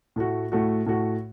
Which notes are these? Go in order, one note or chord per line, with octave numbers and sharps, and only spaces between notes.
A2 A3 F#4
A2 A3 F#4
A2 A3 F#4